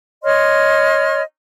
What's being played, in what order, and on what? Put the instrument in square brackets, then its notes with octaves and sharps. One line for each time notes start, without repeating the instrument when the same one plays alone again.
[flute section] C#5 D#5 C6 F6